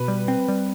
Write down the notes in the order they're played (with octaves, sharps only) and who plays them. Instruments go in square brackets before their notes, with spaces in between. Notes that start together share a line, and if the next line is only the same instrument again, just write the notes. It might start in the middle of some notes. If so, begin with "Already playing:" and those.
Already playing: [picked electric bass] B2 [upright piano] B4
[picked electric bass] G3
C4
G3